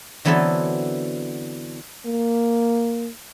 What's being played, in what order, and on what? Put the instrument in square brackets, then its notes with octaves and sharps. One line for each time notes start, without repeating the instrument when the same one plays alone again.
[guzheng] D3 E3 F#3 B3 C4 A4
[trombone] A#3